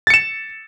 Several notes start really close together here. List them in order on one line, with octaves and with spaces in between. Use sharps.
A6 C#7 E7